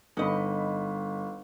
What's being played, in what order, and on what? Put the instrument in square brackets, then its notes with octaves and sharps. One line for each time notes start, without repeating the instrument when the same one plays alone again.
[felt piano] G1 B5 [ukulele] D#4 D#5